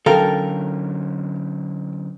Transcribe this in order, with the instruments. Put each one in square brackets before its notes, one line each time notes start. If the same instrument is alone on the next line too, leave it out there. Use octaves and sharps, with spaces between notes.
[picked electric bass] D3 F#3 C#4 [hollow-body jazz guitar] A4 F5 G5 [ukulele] A#4